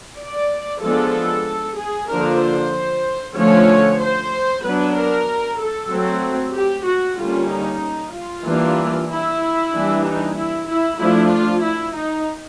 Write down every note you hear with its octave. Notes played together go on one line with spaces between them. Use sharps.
D5
F3 G#3 B3 D4 A4
G#4
D3 F3 A#3 D4 A#4
C5
D3 F3 A3 C#4 C#5
C5
F#3 B3 D4 B4
A#4
A4
F#3 A3 C4
G4
F#4
D3 G3 A#3 C#4 F4
D#4
F4
E3 G3 A#3 D4
E4
E3 G3 A#3 D4
D#4
E4
E4
F3 A3 D4 E4
F4
E4
D#4